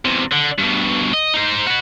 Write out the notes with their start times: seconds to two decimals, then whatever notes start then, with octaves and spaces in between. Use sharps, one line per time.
0.05 E2 C3
0.32 D3
0.59 G2 B2
1.14 D#5
1.34 D#4 C5
1.66 F#4 B4